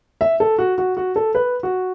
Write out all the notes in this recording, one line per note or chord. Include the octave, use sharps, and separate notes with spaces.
E5
A4
F#4
F#4
F#4
A4
B4
F#4